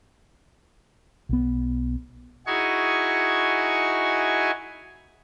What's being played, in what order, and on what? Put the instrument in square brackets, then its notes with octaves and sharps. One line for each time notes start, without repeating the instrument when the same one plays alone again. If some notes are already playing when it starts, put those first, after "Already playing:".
[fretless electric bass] B1 B3
[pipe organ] D#4 E4 F#4 G#4 G#5 C#6